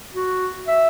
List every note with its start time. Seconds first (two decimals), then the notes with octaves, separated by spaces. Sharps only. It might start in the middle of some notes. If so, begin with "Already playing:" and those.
0.14 F#4
0.68 E5